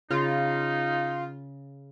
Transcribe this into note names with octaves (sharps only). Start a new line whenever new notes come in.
C#3 D#4 F4 A#5